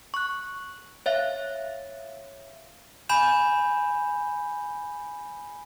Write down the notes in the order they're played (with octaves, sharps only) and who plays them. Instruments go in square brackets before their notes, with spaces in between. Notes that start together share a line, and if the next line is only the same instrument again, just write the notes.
[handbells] C#6 F#6
C#5 E5 F5 F#6
[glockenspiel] G#5 B5 G6 E7